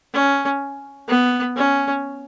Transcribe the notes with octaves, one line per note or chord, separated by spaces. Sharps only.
C#4
B3
C#4